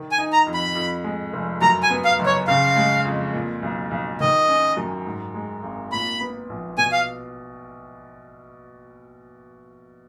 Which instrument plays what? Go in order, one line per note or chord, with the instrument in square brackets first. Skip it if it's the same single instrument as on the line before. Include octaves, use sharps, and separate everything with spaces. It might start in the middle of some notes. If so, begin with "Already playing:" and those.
Already playing: [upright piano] D#3
[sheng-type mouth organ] G#5
[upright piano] D#4
[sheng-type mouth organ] A#5
[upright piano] F2
[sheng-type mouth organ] B5
[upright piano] F2
G#3
F1
[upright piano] F#2 [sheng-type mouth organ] A#5
[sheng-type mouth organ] G#5
[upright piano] B3
[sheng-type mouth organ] F5
[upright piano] F#1
[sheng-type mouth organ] C#5
[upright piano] C#3 [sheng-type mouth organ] F5
[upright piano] G#3
F2
A#2
B1
B1
[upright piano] D#3 [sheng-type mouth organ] D#5
[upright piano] C#4
F#2
G#2
G#3
G#1
[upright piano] A#2 [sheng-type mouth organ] B5
[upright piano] B3
A#1
[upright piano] B2 [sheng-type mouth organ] G#5
[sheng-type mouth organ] F5